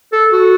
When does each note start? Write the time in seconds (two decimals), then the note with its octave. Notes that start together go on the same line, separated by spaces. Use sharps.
0.12 A4
0.32 F#4